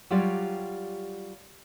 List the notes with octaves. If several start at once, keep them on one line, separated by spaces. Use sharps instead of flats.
F#3 G3 F4 G4 C#5 D5